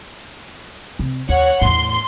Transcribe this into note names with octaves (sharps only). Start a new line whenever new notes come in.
C3
D#2 C#5 F#5
E2 A2 C6